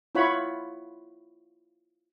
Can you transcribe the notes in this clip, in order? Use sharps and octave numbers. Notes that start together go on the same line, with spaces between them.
E4 F4 C#5 F#5 B5